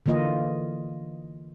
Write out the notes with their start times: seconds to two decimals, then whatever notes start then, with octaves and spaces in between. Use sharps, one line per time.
0.06 D3 E3 A#3 F4 D#5